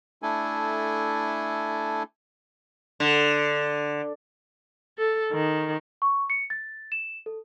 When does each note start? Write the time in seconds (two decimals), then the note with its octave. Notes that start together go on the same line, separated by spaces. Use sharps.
0.23 A3 D4 E4 A4 G#5
3.00 D3
4.98 A4
5.33 D#3
6.02 C#6
6.30 C#7
6.50 A6
6.92 E7
7.26 A4